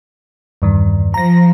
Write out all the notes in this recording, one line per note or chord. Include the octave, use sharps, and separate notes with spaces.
E2 G2 D#3
F3 A#5 A#6